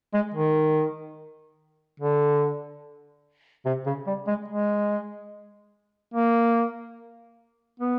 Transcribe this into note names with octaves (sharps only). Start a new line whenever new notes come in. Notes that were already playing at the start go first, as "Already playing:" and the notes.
G#3
D#3
D3
C3
C#3
G3
G#3
G#3
A#3
B3